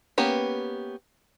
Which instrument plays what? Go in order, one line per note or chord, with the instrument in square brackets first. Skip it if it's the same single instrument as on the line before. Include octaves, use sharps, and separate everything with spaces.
[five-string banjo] A#3 B3 C#4 G4